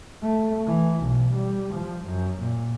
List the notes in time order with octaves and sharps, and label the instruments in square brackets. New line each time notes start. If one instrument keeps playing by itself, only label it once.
[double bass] A3
E3
B1
G3
F3
F#2
A#2